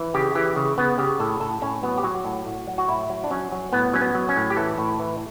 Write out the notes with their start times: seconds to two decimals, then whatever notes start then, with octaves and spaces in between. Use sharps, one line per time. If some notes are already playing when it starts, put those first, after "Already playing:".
Already playing: E3
0.14 C#3 G4
0.35 E3 G4
0.56 C#3
0.78 C#3 B3
0.98 C#3 G4
1.20 A2 A4
1.40 A2 A4
1.62 A2 C#4
1.83 F#3 B3
1.98 G4
2.04 F#3 F#4
2.25 A2
2.46 A2
2.67 F#3
2.78 F#4
2.88 A2 E4
3.10 F#3
3.24 D4
3.31 F#3 C#4
3.52 F#3
3.73 A2 B3
3.93 F#3 C#4
4.01 B3
4.15 F#3
4.29 C#4
4.36 A2
4.50 G4
4.57 E3 A4
4.78 A2
4.99 E3